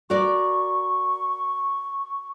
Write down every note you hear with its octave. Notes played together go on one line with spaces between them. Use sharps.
F#4 A#4 D5 C#6